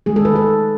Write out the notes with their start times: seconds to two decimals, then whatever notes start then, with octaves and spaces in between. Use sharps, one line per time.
0.06 D#3 G#3 G#4
0.16 A4
0.25 B4
0.35 A4